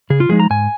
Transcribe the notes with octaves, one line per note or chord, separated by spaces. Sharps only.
C#3 G#4
F4
F3 G#3 D#4 G#4
A#5
G#2 G#5